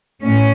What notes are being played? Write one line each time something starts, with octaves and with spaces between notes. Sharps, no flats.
A2 C#4